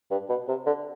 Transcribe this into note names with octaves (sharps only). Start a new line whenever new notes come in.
G2
B2
C3
D3